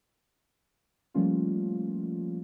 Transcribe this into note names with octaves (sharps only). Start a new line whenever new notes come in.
F3 G3 A3 A#3 C#4 F4